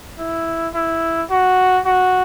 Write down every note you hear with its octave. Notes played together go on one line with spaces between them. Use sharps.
E4
E4
F#4
F#4